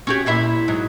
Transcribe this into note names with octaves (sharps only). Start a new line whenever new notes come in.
C#4 F#4 G4
A#2 E4 E5
G#2 F#3